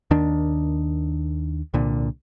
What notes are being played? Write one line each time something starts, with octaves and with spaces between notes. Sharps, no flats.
D#2 D#3 D4
C2 A#2 D3